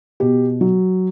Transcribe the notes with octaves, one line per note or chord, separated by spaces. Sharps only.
B2 G4
F#3